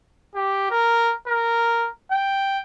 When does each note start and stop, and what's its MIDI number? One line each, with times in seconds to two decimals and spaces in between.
0.35 0.71 67
0.71 1.14 70
1.27 1.88 70
2.12 2.61 79